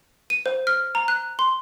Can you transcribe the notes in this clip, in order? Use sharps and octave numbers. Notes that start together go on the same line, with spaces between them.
D#7
C5
F6
A#5
F#6
C6